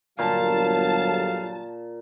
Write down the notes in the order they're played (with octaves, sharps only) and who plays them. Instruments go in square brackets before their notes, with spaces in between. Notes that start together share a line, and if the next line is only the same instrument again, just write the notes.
[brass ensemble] G1 F#3 [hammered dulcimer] A#2 [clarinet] F5 [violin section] A5